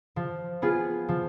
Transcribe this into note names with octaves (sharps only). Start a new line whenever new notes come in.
F3
B3 F4 G#4
F3